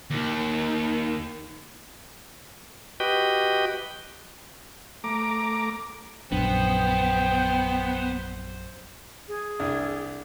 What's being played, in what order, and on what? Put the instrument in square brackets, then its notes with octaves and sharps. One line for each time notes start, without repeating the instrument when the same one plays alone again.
[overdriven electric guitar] D#2 D#3
[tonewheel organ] F#4 G4 B4 D#5 G5
[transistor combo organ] A3 A#5 D6
[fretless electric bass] A#1 F#2 D4 [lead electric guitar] B3 [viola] C5 [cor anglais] G5
[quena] G#4
[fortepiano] C2 D4